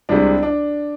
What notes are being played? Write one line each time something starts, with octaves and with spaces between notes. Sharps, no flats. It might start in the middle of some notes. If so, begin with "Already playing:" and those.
C2 C3 G#3 D4
D4